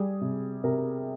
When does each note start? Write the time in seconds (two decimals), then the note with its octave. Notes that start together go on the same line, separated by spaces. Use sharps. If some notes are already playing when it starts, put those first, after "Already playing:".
Already playing: G3 G#4
0.21 C3
0.64 C3 A#4